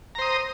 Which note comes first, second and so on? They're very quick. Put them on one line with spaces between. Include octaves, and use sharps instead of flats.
A#5 C5 D#6